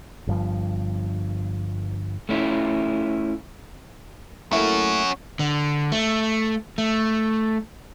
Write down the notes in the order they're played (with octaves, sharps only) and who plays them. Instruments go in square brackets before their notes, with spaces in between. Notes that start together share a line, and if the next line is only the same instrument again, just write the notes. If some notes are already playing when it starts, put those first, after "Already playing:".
[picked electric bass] G1 G2 F3
[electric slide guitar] A3 C#4 E4 F4
[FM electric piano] A3 A#3 E4 [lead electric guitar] C#4 F#4
[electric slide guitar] D3
A3
A3